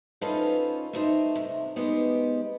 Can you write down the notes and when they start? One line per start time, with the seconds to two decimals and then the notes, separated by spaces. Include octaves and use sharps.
0.21 C#4 D#4 F4 A4 B4 C5
0.93 A3 D#4 C5
1.35 C3
1.76 G#3 B3 D#4 G4 C5